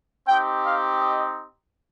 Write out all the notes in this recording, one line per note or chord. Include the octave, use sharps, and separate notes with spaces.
C4 D#4 G4 G5
F5
D#5